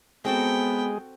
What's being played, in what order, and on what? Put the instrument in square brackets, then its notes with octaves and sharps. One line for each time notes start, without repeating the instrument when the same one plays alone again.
[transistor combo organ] G#3 G#4 [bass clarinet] B3 [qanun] C4 F#4 A4 [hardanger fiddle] G5